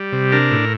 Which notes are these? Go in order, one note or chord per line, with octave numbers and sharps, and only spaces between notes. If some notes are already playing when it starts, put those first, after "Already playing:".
Already playing: G3
C3
D4 A#4
A2